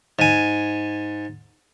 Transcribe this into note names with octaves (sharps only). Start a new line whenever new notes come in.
G#2 G#5